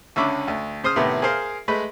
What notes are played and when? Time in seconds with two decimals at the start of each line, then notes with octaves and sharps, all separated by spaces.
0.16 C#2 D3 C#4 E5 B5 D6
0.48 D2
0.84 C#3 C5 C6 D#6 F6
0.96 A2 C3 D#3 B3
1.22 G#4 A#4 C5 F5
1.68 G#3 A3 B4